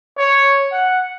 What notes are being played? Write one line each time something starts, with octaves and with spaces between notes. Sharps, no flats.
C#5
F#5